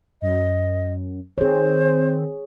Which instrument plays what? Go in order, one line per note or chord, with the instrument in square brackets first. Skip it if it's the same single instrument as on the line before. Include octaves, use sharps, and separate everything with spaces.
[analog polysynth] F#2 [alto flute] D#5
[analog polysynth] D#3 C4 [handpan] G#4 C#5 [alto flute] C5